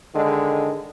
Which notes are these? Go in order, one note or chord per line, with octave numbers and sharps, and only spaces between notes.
D3 D#3 G#3